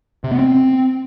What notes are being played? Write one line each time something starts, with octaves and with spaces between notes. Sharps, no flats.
C3
B3
C4